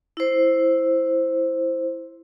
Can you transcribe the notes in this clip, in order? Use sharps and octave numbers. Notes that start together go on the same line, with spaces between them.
E4 C5